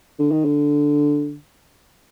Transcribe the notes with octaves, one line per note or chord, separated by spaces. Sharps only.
D3
D#3
D3